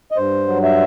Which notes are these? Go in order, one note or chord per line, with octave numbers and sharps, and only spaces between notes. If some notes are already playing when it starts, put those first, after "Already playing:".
D#5
G2 C5
F#3
E5